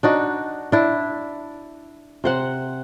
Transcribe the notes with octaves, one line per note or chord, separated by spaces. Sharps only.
D4 D#4 F#4
D4 E4
C3 C5 F#5